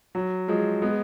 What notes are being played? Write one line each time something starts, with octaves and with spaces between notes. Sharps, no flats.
F#3
F3 G#3
G#3 B3